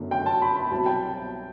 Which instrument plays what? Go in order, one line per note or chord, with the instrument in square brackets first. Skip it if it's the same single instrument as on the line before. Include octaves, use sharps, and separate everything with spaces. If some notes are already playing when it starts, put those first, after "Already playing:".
Already playing: [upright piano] G1 F#2 D3 F#3 A3
G5
A5
B5
B5
C2 B2 F#3 C4 A5
G5